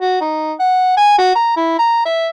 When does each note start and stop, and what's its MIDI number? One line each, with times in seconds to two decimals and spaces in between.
0.01 0.19 66
0.21 0.53 63
0.59 0.96 78
0.97 1.18 80
1.18 1.32 66
1.35 1.56 82
1.56 1.74 64
1.79 2.00 82
2.05 2.28 76